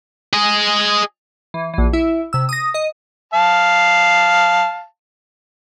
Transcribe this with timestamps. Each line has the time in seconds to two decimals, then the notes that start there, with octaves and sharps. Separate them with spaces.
0.33 G#4 D#5
1.54 E3
1.74 A#1 E3
1.93 E4 E5
2.33 C3 E6
2.49 D#6 A#6
2.74 D#5
3.34 F5 A5